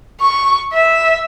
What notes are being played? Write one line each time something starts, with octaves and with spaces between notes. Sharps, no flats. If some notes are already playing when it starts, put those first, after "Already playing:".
C#6
E5